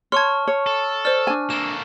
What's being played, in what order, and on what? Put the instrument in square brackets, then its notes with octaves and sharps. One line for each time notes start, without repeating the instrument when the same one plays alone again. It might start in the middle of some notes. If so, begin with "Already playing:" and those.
[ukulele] C#5 [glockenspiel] A5 C#6 F6 [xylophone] C6 G#6
[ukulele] C#5
[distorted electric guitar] A4
[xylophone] C5 D5 [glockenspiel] F6
[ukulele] D4 G#5
[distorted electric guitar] A#3 A4 [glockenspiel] E7